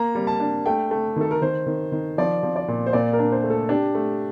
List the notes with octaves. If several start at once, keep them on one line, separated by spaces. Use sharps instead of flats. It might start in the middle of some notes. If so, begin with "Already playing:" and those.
Already playing: A#3 A#5
G3
A5
D4
A3 G5
A3
D#3 A4
A#4
D#3 C5
D#3
D#3
F3 D5
F3
D5
A#2
C5
A#2 D5
A#4
D4
C5
A3
A4
D4 G4
A3